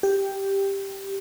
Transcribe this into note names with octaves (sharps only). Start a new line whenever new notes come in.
G4